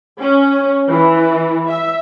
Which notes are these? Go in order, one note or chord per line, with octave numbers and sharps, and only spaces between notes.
C#4
E3
E5